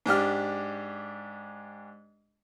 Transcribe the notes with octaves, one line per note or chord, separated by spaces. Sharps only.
G#2 D4 G4 F6